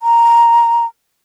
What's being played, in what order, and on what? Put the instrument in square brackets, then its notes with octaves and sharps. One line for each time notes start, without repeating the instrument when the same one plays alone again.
[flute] A#5